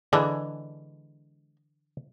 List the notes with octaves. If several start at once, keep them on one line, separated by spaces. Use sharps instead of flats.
D3 E3 G#3 D4